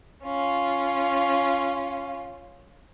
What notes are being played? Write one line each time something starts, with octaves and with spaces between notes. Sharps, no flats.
C#4 F4